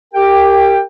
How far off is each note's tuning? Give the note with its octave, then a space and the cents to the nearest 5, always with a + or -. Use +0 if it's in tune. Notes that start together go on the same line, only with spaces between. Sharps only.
G4 +0 A#4 -20 G5 +10